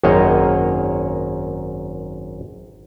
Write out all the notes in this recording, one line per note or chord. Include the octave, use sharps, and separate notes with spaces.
G#1 F#2 D#3 A#3 C#5 D#5